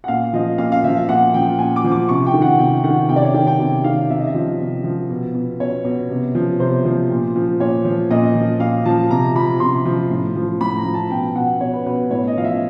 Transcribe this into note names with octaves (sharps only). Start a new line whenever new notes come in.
F#5
A#2 F5
F3 D#5
A#2 F5
F5
F3 E5
E5
A#2 F#5
F3 G5
A#2 G#5
D6
F3
D6
C3 C#6
G5
D#3
F#5
C3 G5
D#3 F#5
C3 G5
D5
C#5
D#3 G5
G5
C3
D#3 F5
C3 E5
D#5
E5
F3
C3
F3
B2
B2
B2 C#5
B2
C3
F3
C3 C5
F3
A#2
F3
A#2 C#5
F3
A#2 D#5
F3
A#2 F5
F3 A5
C3 A#5
F3 B5
C3 C6
F3
A2
F3
A2 B5
A#5
F3
A5
B2 G5
B2 F#5
B2 C#5
B4
B2 B4
A2 C#5
D#5
F3 F5
E5